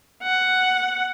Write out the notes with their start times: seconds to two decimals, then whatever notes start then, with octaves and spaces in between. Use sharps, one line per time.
0.22 F#5